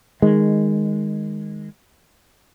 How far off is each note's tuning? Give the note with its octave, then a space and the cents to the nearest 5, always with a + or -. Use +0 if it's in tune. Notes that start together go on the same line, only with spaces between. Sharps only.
D#3 +0 G#3 -10